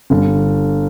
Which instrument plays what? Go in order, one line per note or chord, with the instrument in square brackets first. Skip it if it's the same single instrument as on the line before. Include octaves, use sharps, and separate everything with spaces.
[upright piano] G1